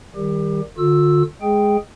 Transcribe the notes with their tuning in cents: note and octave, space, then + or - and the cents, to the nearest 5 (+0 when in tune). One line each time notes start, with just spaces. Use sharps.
D#3 +0 G3 +0 G4 +25
D3 +15 F4 +40 E6 +0
G#3 +0 G#4 +0 G5 +0